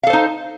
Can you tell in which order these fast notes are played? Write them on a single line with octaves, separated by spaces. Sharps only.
F5 A4 C5 D#4